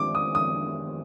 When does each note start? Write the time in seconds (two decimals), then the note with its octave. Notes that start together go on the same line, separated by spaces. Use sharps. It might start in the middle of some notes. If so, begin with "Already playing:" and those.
Already playing: D#3 G#3 D4 G4 D5 D6
0.15 D#6
0.35 D#6